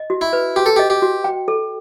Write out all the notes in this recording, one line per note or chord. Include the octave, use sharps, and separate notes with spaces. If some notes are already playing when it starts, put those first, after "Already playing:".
Already playing: D#5
F#4
E4
B4
F#4 G4
A4
G4 D#5
G4
F#4
G5
A4